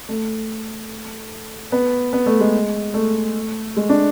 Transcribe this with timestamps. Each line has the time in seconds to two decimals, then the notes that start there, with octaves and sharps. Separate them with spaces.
0.09 A3
1.72 B3
2.13 B3
2.26 A3
2.40 G#3
2.94 A3
3.77 G#3
3.89 D4